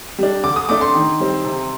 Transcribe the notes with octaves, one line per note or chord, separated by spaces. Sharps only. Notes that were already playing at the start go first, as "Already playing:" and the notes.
G3 D4
D3 D6
D#6
A3 D4 D6
C6
D#3
G3 C4
C3